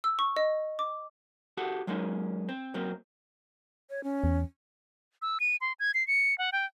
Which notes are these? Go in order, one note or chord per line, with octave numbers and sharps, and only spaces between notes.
E6
C#6
D#5
D6
F#4 G4 A4 F#5
F#3 G#3 A#3 C#4 D#4
C4
F#2 F#3 A#3 C4
C#5
C#4
E2
E6
D#7
C6
G#6
C7
C#7
F#5
G5